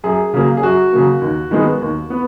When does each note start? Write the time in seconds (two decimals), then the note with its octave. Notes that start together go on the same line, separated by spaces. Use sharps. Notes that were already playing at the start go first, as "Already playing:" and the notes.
0.04 F#2 G#4
0.34 C#3 F#3 A#3
0.57 G#4
0.63 F#2 F#4
0.93 C#3 F#3 A#3
1.22 D#2
1.51 D#3 G#3 B3
1.81 D#2
2.10 B3